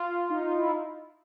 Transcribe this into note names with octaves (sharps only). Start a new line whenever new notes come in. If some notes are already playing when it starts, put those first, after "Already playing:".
Already playing: F4
D#4
F4
E4